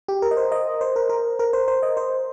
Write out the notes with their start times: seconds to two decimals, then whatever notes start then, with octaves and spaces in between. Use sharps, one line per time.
0.08 G4
0.22 A#4
0.31 D#5
0.37 C5
0.52 D#5
0.81 C5
0.96 A#4
1.09 A#4
1.39 A#4
1.53 C5
1.68 C5
1.83 D#5
1.97 C5